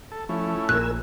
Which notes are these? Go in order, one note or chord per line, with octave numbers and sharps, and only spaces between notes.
A4
F3 A3 C#4 E4
A#1 A#2 A#4 G#5 E6 F#6